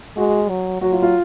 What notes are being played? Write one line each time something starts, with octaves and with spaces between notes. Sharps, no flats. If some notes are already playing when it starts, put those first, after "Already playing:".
G#3 F#4
F#3
F#3 F#4
F4
F4